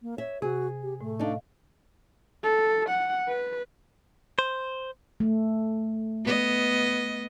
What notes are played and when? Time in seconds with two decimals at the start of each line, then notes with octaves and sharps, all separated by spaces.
0.02 A#3
0.18 C#5 E5
0.42 C3 F#4 G#4
0.83 G4
1.01 A2 A3
1.19 D4 D#4 D#5 F5
2.44 A4
2.89 F#5
3.28 B4
4.39 C5
5.20 A3
6.25 B3 D#5